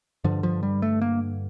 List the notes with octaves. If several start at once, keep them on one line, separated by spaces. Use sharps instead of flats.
G2 D3 F3
F3
G3
A3
A#3